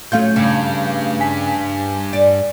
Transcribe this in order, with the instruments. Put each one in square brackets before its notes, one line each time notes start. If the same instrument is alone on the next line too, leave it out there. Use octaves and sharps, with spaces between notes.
[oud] F#3 C#4 F4 [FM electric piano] A3 F5 G6
[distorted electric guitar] G2 [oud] C#3
[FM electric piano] G#5 B6
[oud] D5